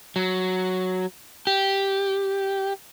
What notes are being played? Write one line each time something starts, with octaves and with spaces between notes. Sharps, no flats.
F#3
G4